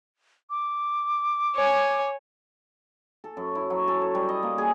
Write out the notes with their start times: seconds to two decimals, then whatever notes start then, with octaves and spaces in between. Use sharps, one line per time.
0.50 D6
1.56 C#5 G#5
3.24 A4
3.37 F#2
3.55 E4
3.70 F#3
3.88 A4
4.01 C#5
4.15 G3
4.29 D#5
4.43 A#3
4.58 G#4